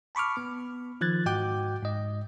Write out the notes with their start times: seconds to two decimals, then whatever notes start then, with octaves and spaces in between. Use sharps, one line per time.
0.15 A5 B5 C#6 D6 F6
0.37 B3
1.01 D#3 F3 F#6 G#6 A6
1.26 G#2 F#4 D#5 G5 D6 G6
1.83 G#2 D#5